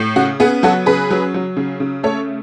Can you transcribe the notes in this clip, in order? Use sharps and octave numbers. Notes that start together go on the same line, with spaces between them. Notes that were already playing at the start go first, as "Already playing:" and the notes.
Already playing: A2
C#3 F#4
B3 G#4
F#3 F#4 A4
C#3 G#4 B4
F#3
F#3
C#3
C#3
A3 A4 C#5